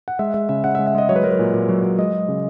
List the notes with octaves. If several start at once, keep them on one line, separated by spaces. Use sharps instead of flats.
F#5
G#3 E5
G#3 E5
C#3 E5
C#3 F#5
E5
G#3
E5
G#3 D#5
F#3 C#5
B4
F#3 A#4
B4
A#2
A#2
F#3
F#3
G#3 D#5
G#3
C#3